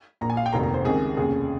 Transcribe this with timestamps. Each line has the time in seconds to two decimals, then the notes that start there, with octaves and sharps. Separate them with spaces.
0.21 A#1 A#2 A#5
0.30 G#5
0.37 F5
0.46 G5
0.53 F1 D#2 D#3 A#5
0.63 A#5
0.74 C5
0.85 C#2 C3 D#3 G#4
1.17 F1 D#2 C#3 G#4